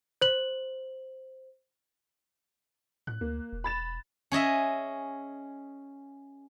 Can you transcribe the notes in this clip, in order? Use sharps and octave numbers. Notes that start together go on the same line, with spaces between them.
C5 F#7
A2 F#6
D2 A#3
E1
B5 A6 E7
C#4 G#4 D#5 E5